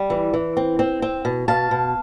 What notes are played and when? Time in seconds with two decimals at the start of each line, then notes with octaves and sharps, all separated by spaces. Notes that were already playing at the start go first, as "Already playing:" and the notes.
Already playing: G3
0.10 E3
0.34 E3
0.57 C4
0.79 C4
1.02 C4
1.25 B2
1.48 B2 F5 A5
1.71 B2